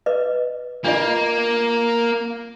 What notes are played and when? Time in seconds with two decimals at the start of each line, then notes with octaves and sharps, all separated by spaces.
0.06 B4 D#5
0.84 A#3 D4 F4 D#5